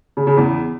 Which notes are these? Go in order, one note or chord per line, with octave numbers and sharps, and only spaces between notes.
C#3
C#3
E2